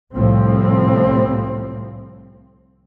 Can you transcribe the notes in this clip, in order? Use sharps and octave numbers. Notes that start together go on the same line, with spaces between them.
C2 A2 F3 C4